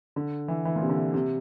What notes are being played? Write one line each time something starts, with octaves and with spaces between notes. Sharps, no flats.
D3
E3
E3
A#2
C3
D3
C3